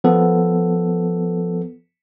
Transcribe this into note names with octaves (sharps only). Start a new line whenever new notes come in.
F3 B3 A4